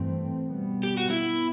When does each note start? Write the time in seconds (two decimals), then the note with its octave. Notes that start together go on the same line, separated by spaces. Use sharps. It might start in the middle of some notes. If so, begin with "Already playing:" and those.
Already playing: G2 E3 A3 C4
0.46 B2 G3 B3
0.83 G4
0.97 F#4
1.10 E4
1.22 B3